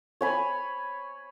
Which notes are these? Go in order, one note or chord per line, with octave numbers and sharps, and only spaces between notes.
C#5 G#5 B5